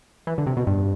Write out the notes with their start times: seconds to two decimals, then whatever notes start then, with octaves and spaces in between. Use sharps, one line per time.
0.27 E3
0.38 D3
0.47 C3
0.57 B2
0.67 G2